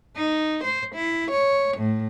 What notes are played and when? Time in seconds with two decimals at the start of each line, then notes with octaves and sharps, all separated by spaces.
0.16 D#4
0.63 C5
0.93 E4
1.31 C#5
1.76 A2